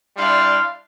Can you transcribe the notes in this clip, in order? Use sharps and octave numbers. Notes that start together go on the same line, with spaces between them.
G3 D4 E4 F5 C6